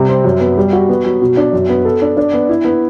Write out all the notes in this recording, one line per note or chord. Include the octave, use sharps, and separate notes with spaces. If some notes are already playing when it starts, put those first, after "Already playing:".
Already playing: C3 G3
C4
F#2
B3
G3
F#4
B3
F#3
B2
D4
F#2
B3
A4
D4
D4
B3
E4
B3